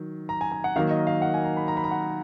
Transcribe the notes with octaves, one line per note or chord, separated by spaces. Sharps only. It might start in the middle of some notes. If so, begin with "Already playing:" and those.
Already playing: D#3 F#3
A#5
G#5
G#5
F#5
D#3 F#3 A#3 F5
D#5
F5
F#5
G#5
A#5
B5
A#5
B5
A#5
F#5